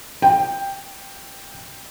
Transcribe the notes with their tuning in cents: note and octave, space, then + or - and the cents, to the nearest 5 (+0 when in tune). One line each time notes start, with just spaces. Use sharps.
G5 +5